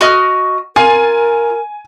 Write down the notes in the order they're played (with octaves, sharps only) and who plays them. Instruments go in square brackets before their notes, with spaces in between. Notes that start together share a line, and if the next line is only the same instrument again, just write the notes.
[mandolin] F#4 D#5 F6
[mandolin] F4 [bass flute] A#4 [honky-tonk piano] G#5